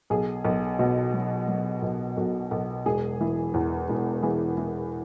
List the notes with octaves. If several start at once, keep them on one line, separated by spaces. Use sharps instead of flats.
B1 G#4
B1
B2 F#4
F#3
F#3
B1
B1 F#4
B1
E1 G#4
E3
E2
E1
E3 G#4
E3